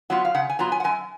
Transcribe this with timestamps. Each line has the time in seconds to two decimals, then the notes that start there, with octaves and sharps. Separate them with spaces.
0.10 F#3 B3 F4 F#5
0.25 F5
0.34 C#3 F#5
0.49 G#5
0.59 F#3 B3 F4 A#5
0.72 G#5
0.80 F#5
0.84 F#2 G#5